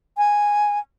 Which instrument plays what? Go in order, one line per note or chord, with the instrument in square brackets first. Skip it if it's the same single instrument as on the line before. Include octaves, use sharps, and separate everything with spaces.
[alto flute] G#5